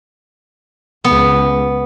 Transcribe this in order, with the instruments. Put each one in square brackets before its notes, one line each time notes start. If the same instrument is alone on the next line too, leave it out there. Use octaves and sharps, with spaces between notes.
[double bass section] C#2 [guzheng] B3